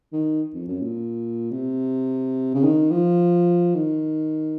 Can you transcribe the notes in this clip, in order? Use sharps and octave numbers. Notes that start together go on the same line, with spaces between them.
D#3
F2
F#2
A#2
C3
C#3
D#3
F3
D#3